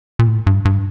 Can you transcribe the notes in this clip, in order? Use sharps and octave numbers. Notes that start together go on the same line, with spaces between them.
A#2
A2
G2
G2